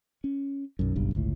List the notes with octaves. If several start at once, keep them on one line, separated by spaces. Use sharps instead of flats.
C#4
B1 F#2
F#1 B1 G2
G1 C#2 A2